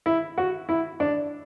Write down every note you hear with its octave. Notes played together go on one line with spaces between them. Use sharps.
E4
F#4
E4
D4